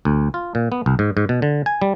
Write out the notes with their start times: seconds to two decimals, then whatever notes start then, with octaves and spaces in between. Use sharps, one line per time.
0.05 D2
0.34 F4
0.55 A#2
0.72 B3
0.86 C2
0.99 G#2
1.17 G#2
1.29 B2
1.42 D3
1.66 G#5
1.82 G3